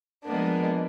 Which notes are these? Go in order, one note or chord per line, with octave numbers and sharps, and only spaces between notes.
F3 G#3 A#3 B3 D4